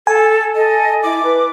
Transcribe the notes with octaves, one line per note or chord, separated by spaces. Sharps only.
A4 G#5
A4 D#5
E4 D6
B4